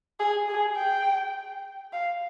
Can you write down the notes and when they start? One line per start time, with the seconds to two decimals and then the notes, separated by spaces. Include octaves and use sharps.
0.20 G#4
0.49 G#4
0.77 G5
1.93 F5